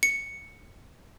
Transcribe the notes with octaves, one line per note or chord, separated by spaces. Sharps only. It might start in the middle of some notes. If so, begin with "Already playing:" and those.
C#7